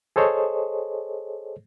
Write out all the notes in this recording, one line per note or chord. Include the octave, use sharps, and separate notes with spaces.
G#4 A4 C5 C#5 D#5